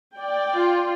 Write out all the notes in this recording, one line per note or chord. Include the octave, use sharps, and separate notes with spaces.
D5 G5
F4